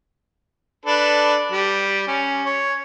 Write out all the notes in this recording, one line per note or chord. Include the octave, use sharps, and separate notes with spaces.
D4 A4 B4
G3
C#4
C#5